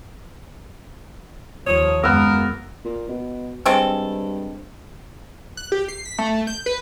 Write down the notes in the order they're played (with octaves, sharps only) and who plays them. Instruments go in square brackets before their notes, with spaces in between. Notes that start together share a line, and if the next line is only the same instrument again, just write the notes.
[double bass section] D#2 F3 A#3 [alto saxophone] C#5 [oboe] D#6
[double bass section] F#2 G#3 [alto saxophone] A#3 [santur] B3 E6 [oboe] A#4
[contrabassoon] A#2
B2
[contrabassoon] G2 [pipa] G#3 C4 A4
[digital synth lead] F#6
G4
C7
B6
A3
G6
B4